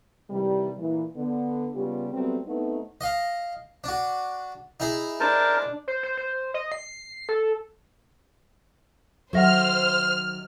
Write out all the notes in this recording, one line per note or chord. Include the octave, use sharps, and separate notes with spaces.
C3 D#3 E3 G3
A#2 E3
D3 B3
C#3 G3 B3 F4 G4
F#3 G3 A3 B3 C4
A3 B3 C4 D#4
D#5 F5
D4 F#4
D#4 E4 G#4
D4 A#4 C5 A5
C5
C5
C5
D#5
C7
A4
D#3 F#3 A4 C5 E5 F#5 F6